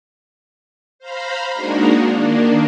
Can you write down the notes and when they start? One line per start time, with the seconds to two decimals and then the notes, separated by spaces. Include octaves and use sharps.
0.99 C5 F5 A#5 B5
1.53 G#3 A#3 D4 D#4 F#4 A#4
2.06 D#3 A#3 D4